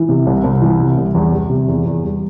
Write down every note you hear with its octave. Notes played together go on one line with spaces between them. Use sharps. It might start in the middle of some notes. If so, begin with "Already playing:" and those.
Already playing: E3
C3
C2
C2
E3
C3
C2
E2
G3
C3
E2
E2
G3